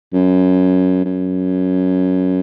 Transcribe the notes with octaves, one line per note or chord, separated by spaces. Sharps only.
F#2
F#2